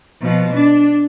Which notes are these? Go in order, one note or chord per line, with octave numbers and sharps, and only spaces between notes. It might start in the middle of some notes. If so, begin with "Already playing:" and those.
B2 F3
D4